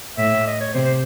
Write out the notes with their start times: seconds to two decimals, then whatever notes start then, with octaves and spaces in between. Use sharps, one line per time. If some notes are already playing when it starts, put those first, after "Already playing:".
0.18 A2 E5
0.47 D#5
0.60 C#5
0.74 C3 C5
0.85 C5